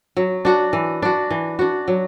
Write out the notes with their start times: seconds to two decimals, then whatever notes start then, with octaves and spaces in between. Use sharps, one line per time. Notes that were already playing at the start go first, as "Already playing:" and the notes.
0.17 F#3
0.45 D4 F#4
0.73 E3
1.02 D4 F#4
1.31 E3
1.59 D4 F#4
1.88 F#3